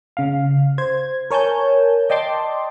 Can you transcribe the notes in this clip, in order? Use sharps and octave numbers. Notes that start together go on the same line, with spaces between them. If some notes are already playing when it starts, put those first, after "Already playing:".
C#3 F5
C5 G#6
A#4 C#5 G#5 A5 G6
D5 D#5 G5 A5 C6 D6